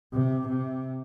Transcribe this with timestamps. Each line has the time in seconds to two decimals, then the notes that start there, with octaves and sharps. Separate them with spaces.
0.13 C3
0.48 C3